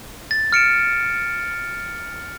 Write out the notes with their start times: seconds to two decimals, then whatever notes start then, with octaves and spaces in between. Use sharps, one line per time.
0.31 A6
0.52 F6 C#7 D7 E7